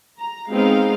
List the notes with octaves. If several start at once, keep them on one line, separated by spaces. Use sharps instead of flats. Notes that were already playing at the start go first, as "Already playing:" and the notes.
A#5
G#3 B3 C4 D#4 F5